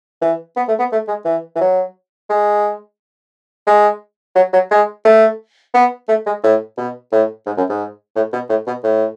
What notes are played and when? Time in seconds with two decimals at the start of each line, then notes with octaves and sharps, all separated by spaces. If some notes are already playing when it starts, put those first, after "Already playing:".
0.22 E3
0.57 B3
0.68 A3
0.79 B3
0.92 A3
1.08 G#3
1.25 E3
1.56 E3
1.61 F#3
2.30 G#3
3.67 G#3
4.35 F#3
4.53 F#3
4.71 G#3
5.05 A3
5.74 B3
6.08 A3
6.26 G#3
6.44 A2
6.77 B2
7.12 A2
7.46 G#2
7.57 F#2
7.69 G#2
8.16 A2
8.33 B2
8.49 A2
8.67 B2
8.84 A2